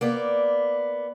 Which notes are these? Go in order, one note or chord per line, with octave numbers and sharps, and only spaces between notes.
A#3 B3 D5